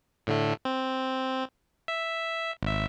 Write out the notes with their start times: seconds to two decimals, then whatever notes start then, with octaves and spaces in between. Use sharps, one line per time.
0.27 A2 D3 A3
0.65 C4
1.88 E5
2.63 G#1 E5